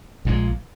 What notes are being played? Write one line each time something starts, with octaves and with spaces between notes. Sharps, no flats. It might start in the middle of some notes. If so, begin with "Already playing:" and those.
A#1 A#2 G#3